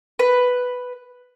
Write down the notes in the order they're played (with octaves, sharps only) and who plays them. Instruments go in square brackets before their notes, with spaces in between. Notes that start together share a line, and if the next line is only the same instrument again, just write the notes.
[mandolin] B4